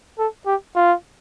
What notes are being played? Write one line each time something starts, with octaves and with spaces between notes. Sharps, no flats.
A4
G4
F4